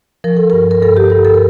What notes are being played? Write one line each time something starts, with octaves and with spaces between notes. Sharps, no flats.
F3 A#4
A4
G2 A#4
A#4
G2 A4
G4
G2 A4
A4
A#4